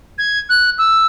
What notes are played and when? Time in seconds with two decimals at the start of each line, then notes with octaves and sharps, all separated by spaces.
0.18 G#6
0.49 F#6
0.78 E6